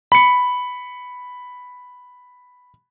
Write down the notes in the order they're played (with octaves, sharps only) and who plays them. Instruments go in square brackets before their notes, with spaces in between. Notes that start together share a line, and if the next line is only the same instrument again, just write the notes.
[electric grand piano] B5 C#7